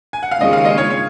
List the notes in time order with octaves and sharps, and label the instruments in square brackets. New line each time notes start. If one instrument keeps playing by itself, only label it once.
[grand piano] G#5
F#5
F5
[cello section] D#2 C#3 G#3 C#4 F4 [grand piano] D#5
[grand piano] F5
D#5
C#5
C#5